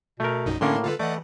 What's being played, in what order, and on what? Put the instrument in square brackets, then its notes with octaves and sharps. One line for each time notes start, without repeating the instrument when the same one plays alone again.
[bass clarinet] B2 [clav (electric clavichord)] A3 A#4
[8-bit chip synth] A#1 F#2 D#4
[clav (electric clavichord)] A2 A#3 [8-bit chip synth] D3 D4 C6 [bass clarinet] C#4
[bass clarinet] D3 [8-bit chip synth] F4 A4 B4
[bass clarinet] E3 [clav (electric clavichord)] A3 [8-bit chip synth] D5 D#5 F#5